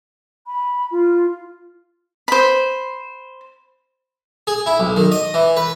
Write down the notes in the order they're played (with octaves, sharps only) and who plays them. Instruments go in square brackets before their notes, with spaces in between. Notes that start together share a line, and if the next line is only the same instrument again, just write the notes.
[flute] B5
F4
[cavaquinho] C5 B5
[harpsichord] G#4
E4
B1
D#3
D#5
E3
B4